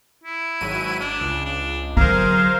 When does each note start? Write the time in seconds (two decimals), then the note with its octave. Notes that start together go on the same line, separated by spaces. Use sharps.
0.24 E4
0.61 G#1 F#3 D#7
1.00 D4
1.21 C#2
1.46 D4
1.97 D3 F#3 G#4 A#4 C5 F5